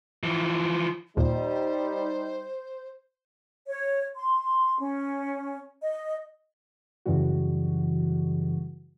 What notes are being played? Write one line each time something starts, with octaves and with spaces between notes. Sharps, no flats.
E3 F3
D#2 A#2 G3 D#4 C5
C#5
C6
C#4
D#5
F#2 C#3 E3 G3 F#4